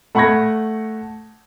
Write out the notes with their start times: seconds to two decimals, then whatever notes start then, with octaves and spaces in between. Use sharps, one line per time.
0.15 A3 F#5 B5 C#6 G#6 A#6